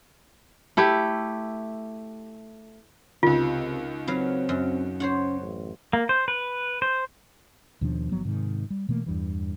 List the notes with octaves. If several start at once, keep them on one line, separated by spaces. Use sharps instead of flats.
A3 E4 G4
C#2 C3 D#3 F4
F#3 C4 B4 F5
F#2
C#4 C5 C#5 F#5
A1
A#3
C5
B4
C5
D#2 B2 F3 D4
G1 F3 F#3 B3
G#2 C3 D#3
G3
B2 E3 A3 A#3
E2 G2 E3